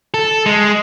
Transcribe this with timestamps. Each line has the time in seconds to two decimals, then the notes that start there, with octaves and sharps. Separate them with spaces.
0.14 A4
0.46 G#3